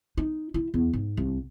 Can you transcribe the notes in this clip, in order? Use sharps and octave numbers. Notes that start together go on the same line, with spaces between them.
D#4
E4
E2
G#2
C2